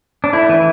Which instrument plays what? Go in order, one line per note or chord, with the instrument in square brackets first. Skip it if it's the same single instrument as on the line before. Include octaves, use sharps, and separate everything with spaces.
[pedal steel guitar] D4
A3 E4
E3